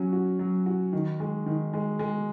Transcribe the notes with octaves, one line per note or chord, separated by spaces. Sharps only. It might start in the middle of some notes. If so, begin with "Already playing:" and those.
Already playing: F#3 C#4 F#4
F#4
F#3
F#4
D#3
G#3
D#3
G#3
G#3